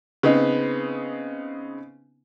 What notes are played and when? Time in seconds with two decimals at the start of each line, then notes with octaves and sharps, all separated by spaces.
0.23 C#3 B3 C4 D#4